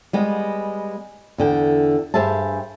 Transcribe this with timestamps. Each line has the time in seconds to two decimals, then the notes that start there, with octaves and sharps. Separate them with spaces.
0.13 G3 G#3 B3
1.38 E2 D3 G5
2.14 G2 G4 G#4 C5 E5 A5